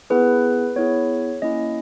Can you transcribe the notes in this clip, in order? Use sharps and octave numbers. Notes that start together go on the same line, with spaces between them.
B3 E4 G#4 B4
B3 E4 G#4 C#5
A#3 C#4 E4 D#5